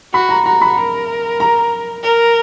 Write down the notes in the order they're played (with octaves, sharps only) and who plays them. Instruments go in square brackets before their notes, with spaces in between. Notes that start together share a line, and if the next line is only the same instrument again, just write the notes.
[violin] F#4 [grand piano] B5
[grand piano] A#5
[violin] F#4 [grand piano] A#5
[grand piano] B5
[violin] A#4
[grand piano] A#5
[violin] A#4